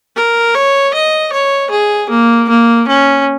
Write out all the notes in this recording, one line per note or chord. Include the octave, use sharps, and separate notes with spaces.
A#4
C#5
D#5
C#5
G#4
A#3
A#3
C#4